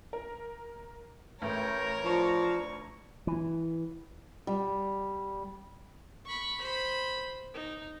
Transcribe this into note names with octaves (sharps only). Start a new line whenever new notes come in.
A#4
A1 A3 A#4 C#5 G5
F3 D4 A#5 C#6
E3
G3
B5 C#6
C5 B5
D#4